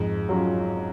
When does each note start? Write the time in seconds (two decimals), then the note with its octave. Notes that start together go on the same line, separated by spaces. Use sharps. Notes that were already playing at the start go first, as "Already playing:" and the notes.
Already playing: F2 G#2
0.29 F#3 C#4 F4